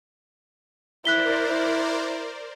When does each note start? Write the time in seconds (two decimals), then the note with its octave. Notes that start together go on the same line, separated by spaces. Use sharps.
1.05 E4 A#4 C5 D5 F#6 B6 G7
1.48 E4